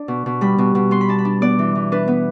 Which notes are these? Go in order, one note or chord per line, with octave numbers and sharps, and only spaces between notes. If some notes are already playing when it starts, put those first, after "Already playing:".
Already playing: D4 D5
B2
B2
G3 B5
B2
B2
B3 C6
B5
D4 A5
B5
D4
B3 D5
E3
E3
D4 B4
B3